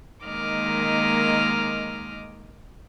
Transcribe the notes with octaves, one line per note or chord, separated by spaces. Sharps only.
D#3 G#3 A#3 D#5 D6 F6